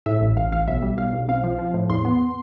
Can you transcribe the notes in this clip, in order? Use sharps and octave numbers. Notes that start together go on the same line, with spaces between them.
A2 E5
A1
A1 F5
A1 F5
B1 E5
G3
B1 F5
B1
C4 F5
F3
F3
A2
E2 C6
B3